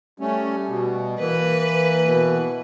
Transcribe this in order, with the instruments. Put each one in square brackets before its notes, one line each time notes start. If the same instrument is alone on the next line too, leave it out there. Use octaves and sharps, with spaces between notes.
[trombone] G3 [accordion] A3 C#4
[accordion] B2
[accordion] E3 [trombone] A#3 [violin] B4
[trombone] B2